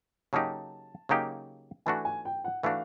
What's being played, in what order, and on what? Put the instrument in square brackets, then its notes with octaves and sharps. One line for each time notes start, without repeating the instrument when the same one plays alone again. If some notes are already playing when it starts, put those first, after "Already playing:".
[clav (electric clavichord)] C#3 F#3 A#3 D#4 G4 [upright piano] A5
[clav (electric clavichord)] C#3 F#3 A#3 D#4 G4
[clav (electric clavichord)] E3 A3 D4 F#4 [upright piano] G#5
[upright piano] G#5
G5
F#5
[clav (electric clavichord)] E3 A3 D4 F#4 [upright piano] F5